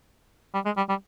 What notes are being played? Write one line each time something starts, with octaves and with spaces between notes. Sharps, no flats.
G3
G#3
G3
G3